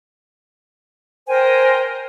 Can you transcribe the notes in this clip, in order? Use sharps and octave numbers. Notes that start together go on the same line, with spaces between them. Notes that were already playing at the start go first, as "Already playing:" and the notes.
A#4 C5 G5 G#5